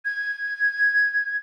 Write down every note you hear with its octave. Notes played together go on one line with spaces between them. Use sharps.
G#6